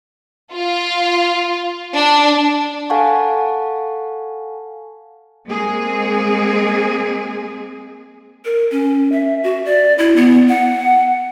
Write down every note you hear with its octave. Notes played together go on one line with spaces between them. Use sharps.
F4
D4
A4 F5 F#5 G#5 A5 C#6
G#3 A#3 C4 G#4
A#4
C#4
E5
F#4
D5
E4
B3
F#5